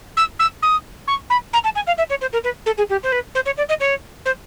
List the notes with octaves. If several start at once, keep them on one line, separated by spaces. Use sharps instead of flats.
E6
E6
D#6
C#6
B5
A#5
A5
G#5
F5
E5
C#5
C5
A#4
B4
A4
G#4
G4
C5
B4
C5
C#5
D5
D#5
C#5
C5